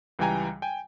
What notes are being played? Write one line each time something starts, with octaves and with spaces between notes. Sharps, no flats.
C#2 E3 G3 G5 G#5 A#5
G5 G#5